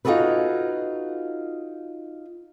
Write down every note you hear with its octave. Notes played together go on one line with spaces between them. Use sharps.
D#4 F4 F#4 G#4 A4 B4